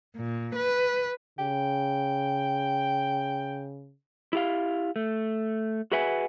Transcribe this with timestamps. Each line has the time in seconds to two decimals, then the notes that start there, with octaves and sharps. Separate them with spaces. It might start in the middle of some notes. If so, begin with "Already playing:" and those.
0.16 A#2
0.55 B4
1.39 C#3 G5
4.33 E4 G4 F5
4.96 A3
5.92 F#4 G#4 B4 E5 F#5 G#5